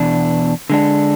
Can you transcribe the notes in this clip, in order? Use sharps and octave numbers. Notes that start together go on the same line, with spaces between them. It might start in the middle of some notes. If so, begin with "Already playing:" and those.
Already playing: E2 B2 D4
D3 G#3 D4